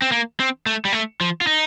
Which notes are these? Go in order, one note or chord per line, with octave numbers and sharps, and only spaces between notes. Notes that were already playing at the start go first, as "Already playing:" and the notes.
C4
A#3
C4
A3
G3
A3
F3
F4
D#4